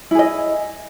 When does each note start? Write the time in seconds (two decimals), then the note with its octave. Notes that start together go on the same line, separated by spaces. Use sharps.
0.11 E4
0.15 G#4
0.19 D#5